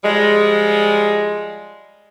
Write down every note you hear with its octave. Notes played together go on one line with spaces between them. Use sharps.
F3 G3 G#3